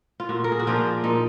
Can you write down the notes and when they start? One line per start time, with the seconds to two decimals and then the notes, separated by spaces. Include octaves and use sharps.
0.20 F4
0.29 A#2 F#4
0.44 A#4
0.52 G#4
0.59 F#4
0.67 F3 A#3 D4 F4
1.04 A#2 D#4